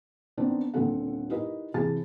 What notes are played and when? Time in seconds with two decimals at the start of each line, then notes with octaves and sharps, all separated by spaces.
0.37 D#3 B3 C4 D4 D#4
0.74 D#1 A#2 D3 C4 A4 F#5
1.29 D#4 E4 G4 A#4 B4 D#5
1.74 C3 E3 G#4 A5 A6